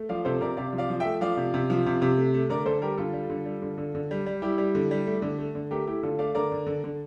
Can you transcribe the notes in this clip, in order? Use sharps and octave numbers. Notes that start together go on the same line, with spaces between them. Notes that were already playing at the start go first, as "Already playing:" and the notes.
Already playing: A3
F3 D5 F5
C3 A4 C5
C3 A#4 D5
C3 D5 F5
F3
D5 F5
F3
A3 E5 G5
F3 D5 F5
C3
C3
F3
C3
C3
A3
A3
D3 A#4 D5
D3 A4 C5
G3 G4 A#4
D3 F4 A4
G3
D3
G3
D3
D3
D3
G3
G3
G3 E4 G4
G3
D3
G3
A3
D3
A3
D3
A3 G4 A#4
A3 E4 G4
D3 F4 A4
A3 D5 F5
D3 A#4 D5
D3
D3
D3